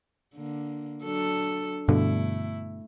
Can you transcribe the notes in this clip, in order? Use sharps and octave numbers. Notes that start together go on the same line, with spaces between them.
D3 A#3
F#3 D4 A4
G2 B2 D3 A3 E4